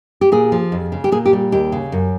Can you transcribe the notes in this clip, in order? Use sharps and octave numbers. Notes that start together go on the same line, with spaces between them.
G4
A#2 G#4
F3
F2
C#3
G4
A#2 G#4
G4
G3
D#2 G4
C#3
F#2